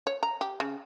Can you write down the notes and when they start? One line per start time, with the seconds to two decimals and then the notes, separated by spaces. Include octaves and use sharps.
0.07 C#5
0.23 A#5
0.41 G4
0.60 C#3